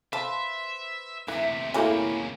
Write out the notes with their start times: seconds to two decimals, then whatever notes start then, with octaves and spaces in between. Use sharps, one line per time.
0.13 B4 C5 E5 F5 A5
1.28 D2 C3 E3 E5
1.74 A3 A#3 C#4 E4 F#4 G#4 G#5